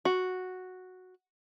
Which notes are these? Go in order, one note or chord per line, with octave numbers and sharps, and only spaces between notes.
F#4